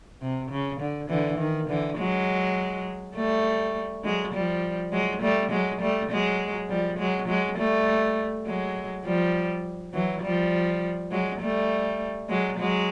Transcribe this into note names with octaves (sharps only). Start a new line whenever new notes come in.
C3
C#3
D3
D3 E3
D#3
D3 E3
F#3 G#3
G3 A3
F#3 G#3
F3 G3
F#3 G#3
G3 A3
F#3 G#3
G3 A3
F#3 G#3
F3 G3
F#3 G#3
F#3 G#3
G3 A3
F#3 G#3
F3 G3
E3 F#3
F3 G3
F#3 G#3
G3 A3
F#3 G#3
F#3 G#3